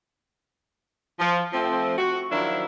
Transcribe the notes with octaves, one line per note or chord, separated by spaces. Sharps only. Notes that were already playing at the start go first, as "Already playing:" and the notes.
F3
F3 A3 C4
F#4
D#3 F3 F#3 D4 E4